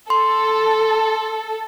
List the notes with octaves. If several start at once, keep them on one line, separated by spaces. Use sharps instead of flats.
A4 C6